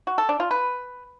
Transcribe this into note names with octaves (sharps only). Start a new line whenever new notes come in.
F#4
A4
D4
F4
B4